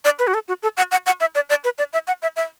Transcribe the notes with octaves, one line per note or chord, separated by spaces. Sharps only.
D5
B4
F#4
A4
F#4
A4
F#5
F#5
F#5
E5
D5
D5
B4
D5
E5
F#5
E5
E5